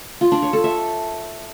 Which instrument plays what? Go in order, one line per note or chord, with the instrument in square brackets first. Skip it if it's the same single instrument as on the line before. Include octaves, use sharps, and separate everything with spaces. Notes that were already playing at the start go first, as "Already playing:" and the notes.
[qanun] F4
D4
C#5
A4
E5